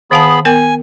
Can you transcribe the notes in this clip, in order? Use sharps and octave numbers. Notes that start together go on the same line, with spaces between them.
D#3 B3 G#4 F5 A5 B5
B3 A#4 G5 G#5